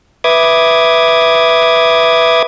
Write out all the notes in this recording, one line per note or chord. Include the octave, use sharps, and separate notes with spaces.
B4 E5 D6 D#6 G#6